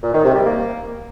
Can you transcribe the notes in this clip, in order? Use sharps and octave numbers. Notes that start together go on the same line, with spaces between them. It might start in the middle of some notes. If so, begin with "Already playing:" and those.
A#2
D#3
C3
G3
A#3